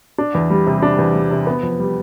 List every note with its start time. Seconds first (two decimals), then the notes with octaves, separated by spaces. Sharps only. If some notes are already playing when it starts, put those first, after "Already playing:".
0.18 D4
0.34 E2
0.50 G3
0.67 C3
0.82 D4
0.98 E2
1.15 G3
1.31 C3
1.47 B3
1.63 F2
1.79 G3